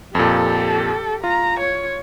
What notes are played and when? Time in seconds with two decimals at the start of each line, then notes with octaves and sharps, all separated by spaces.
0.15 F2 A#2 G4 A4
1.24 F4 A#5
1.60 C#5